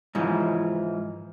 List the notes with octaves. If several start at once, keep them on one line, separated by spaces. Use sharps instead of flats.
G#2 E3 F3